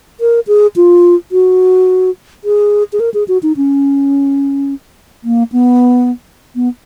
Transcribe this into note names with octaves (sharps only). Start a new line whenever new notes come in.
A#4
G#4
F4
F#4
G#4
G#4
A#4
G#4
F#4
D#4
C#4
A#3
B3
B3